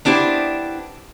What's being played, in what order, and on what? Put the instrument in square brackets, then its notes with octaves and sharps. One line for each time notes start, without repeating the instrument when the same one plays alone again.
[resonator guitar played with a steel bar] B3 D4 E4 G4 C5